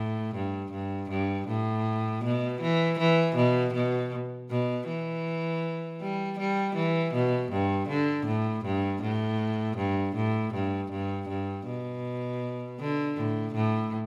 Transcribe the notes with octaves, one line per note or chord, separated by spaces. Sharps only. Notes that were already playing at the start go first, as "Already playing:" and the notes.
Already playing: A2
G2
G2
G2
A2
B2
E3
E3
B2
B2
B2
E3
G3
G3
E3
B2
G2
D3
A2
G2
A2
G2
A2
G2
G2
G2
B2
D3
A2
A2